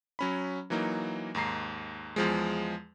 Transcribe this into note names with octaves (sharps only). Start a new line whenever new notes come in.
F#3 C#4 B5
E3 F#3 A#3 D#4
D#2 G#2 A#5 C7
E2 F3 G#3